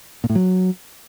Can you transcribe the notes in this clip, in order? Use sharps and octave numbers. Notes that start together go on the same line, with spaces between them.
A#2
A2
F#3